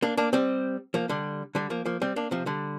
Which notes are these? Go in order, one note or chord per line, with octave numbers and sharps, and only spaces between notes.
A#3 D4
A#3 D4
G3 C4
F3 A#3
D3 G3
D3 G3
F3 A#3
F3 A#3
G3 C4
A#3 D4
C3 F3
D3 G3